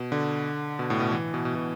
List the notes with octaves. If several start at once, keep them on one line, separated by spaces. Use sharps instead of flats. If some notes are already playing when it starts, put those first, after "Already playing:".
Already playing: B2
D3
B2
A2
B2
E3
B2
B2
B2